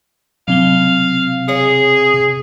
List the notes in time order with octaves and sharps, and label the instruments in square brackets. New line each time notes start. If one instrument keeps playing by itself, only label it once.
[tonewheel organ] C3 [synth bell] F#3 C4 G7 [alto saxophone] F5
[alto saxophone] G#4 [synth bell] C#5 F5 C#7